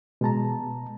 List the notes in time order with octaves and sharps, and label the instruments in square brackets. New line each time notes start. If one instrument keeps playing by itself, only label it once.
[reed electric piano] B2 G#3 A5 A#5